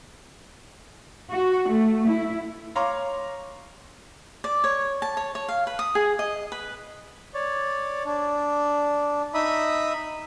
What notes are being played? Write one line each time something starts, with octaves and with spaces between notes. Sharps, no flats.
F#4
A3
E4
C#5 F5 A#5 C6 D6
D5
C#5
A5
C#5
C#5
F5
B4
D#6
G#4
D#5
B4
C#5 D5
D4
D#4 E5 B5 D#6